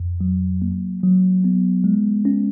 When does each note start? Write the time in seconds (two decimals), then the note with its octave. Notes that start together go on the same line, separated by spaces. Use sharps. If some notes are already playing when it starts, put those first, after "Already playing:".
Already playing: F2
0.21 F#3
0.62 A#3
1.03 F#3
1.44 B3
1.84 G#3
2.25 C#4